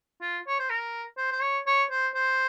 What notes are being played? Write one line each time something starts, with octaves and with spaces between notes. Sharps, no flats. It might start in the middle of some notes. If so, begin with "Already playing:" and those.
F4
C#5
C5
A#4
C5
C5
C#5
C#5
C5
C5